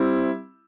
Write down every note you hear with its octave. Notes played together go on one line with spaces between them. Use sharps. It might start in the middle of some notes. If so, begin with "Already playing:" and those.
Already playing: G3 C4 E4